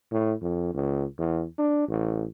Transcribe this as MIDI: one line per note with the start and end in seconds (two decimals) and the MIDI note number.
0.12 0.33 45
0.42 0.74 41
0.74 1.04 37
1.19 1.44 40
1.58 1.87 62
1.88 2.26 33